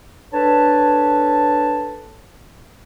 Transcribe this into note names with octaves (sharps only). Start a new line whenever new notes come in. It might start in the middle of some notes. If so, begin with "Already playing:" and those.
D4 A4 B4 C#5 A5